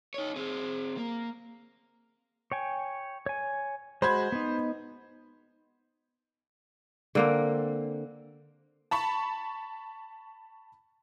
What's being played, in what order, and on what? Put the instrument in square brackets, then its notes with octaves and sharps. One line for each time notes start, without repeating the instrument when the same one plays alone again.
[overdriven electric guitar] D#4 C#5
C4 G#4
A#3
[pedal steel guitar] C#5 G5 G#5
C#5 G#5
[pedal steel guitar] G#3 F#4 [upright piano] C5 B5 G#6
[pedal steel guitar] B3 D#4
[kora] D3 A#3 C4
[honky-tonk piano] A5 B5 C#6